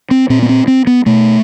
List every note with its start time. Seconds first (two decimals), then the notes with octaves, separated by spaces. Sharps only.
0.11 C4
0.30 A#2 C4
0.42 B3
0.49 C4
0.68 C4
0.87 B3
1.06 B2 A3